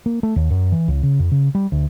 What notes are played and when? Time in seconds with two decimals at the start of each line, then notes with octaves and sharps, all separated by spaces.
0.06 A#3
0.23 A3
0.36 D#2
0.50 F#2
0.72 E3
0.88 C#2
1.03 C#3
1.19 F2
1.32 C#3
1.55 G3
1.72 D2